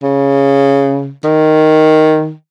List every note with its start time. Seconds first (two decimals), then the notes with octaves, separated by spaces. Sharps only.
0.03 C#3
1.24 D#3